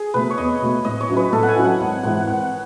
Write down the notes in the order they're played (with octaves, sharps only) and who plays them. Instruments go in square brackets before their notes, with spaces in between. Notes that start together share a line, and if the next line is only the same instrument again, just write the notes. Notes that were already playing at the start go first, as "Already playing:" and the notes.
Already playing: [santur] G#4
[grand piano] B2 A3 [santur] B4
[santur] C#5
[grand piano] E2 [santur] D#5
[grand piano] B2 A3
[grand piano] A2 [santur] D#5
[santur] C#5
[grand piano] F#3 C#4 E4
[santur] B4
[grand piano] A2 [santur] A4
[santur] F#5
G#5
[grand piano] F#3 C#4 E4
[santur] F#5
[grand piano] G#1 [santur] F#5
[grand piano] G#2 E3 [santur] F#5
[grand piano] G#1 [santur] F#5